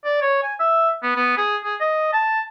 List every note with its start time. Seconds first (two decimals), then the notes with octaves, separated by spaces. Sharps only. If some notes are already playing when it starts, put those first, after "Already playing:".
0.05 D5
0.22 C#5
0.43 G#5
0.60 E5
1.03 B3
1.16 B3
1.37 G#4
1.64 G#4
1.80 D#5
2.13 A5